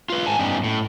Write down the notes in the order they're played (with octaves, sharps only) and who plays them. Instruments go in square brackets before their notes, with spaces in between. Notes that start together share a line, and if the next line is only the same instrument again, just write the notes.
[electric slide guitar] F4 B4
G#2 G#5 A5
G2 B3 C#4 D#4 G4
A2